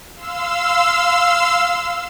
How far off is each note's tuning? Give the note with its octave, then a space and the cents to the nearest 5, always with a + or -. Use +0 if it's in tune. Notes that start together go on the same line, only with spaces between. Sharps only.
F5 +0 C6 -25 E6 +0